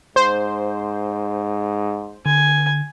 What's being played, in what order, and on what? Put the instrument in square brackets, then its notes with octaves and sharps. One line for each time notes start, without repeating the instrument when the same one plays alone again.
[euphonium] G#2 [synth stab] C5
[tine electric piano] D3 [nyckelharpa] G#5